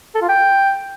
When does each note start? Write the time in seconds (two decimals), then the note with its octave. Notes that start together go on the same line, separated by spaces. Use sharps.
0.14 A4
0.22 F4
0.29 G5